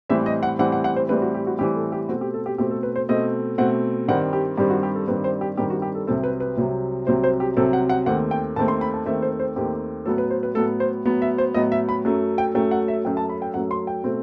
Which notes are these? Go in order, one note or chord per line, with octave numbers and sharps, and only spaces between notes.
A2 E3 G3 C4 E5
D#5
F#5
A2 E3 G3 C4 F#5
F#5
F#5
C5
A2 E3 G3 C4 B4
F#4
G4
F#4
A2 E3 G3 C4 G4
A4
G4
B2 A3 C4 F#4
G4
A4
G4
B2 A3 C4 G4
A4
B4
C5
B2 A3 C4 D#5
B2 A3 C4 F#5
G2 D#3 G3 C4 F#5
G4
G2 D#3 G3 C4 G4
F#4
G4
A4
G2 D#3 G3 C4 B4
C5
G4
G2 D#3 G3 C4 G4
F#4
G4
A4
C2 C3 F#3 C4 A4
B4
B4
C2 C3 F#3 C4
C2 C3 F#3 C4 C5
C5
G4
C2 C3 F#3 C4 A4
F#5
F#5
D#2 D#3 A3 C4 F#5
G5
D#2 D#3 A3 C4 A5
C6
B5
A5
D#2 D#3 A3 C4 E5
C5
C5
D#2 D#3 A3 C4 G4
A2 F#3 B3 A4
B4
C5
B4
A2 F#3 B3 A4
C5
A2 F#3 B3
E5
C5
A2 F#3 B3 D#5
E5
B5
F#2 F#3 A3
G5
F#2 F#3 A3 G5
F#5
E5
F#2 F#3 A3 G5
A5
B5
G5
F#2 F#3 A3 F#5
C6
G5
B2 A3 C4